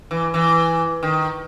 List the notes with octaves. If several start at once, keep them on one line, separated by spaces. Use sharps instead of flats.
E3
E3
D#3